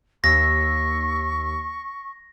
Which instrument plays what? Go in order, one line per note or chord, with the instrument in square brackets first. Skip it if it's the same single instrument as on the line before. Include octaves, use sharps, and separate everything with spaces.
[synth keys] D#2 E6 B6 [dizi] C#6 [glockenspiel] A#6